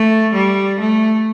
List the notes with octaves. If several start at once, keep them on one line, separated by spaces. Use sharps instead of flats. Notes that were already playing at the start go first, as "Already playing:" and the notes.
Already playing: A3
G3
A3